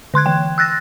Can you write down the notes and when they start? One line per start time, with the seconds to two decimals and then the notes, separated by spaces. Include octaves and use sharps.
0.14 D3 C6 F#6 G#6
0.26 E3 G5
0.58 E6 F#6 A6 A#6